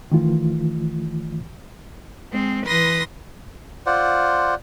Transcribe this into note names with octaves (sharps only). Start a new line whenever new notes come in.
D#3 E3 A3 F4
G#3 C4
E3 B4 C6 D#6 A#6
F4 C5 D5 F#5